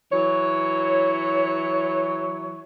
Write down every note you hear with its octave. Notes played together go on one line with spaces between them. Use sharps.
E3 F#3 C#5